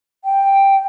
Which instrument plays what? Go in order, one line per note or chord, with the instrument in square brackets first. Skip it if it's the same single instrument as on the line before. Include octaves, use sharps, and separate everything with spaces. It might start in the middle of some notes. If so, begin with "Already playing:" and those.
[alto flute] G5